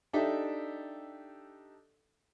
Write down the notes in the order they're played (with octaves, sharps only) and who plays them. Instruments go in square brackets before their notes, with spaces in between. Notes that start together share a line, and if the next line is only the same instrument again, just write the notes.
[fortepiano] D4 D#4 G4 A4 E5